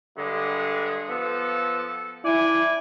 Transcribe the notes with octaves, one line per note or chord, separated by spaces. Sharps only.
G2 D3 G#3
F3 B3 A4
D4 E4 D5 G#5